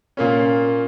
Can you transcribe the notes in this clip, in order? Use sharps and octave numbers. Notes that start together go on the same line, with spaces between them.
A#2 A#3 C#4